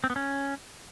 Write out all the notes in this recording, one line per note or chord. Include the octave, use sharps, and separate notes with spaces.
C4
B3
C#4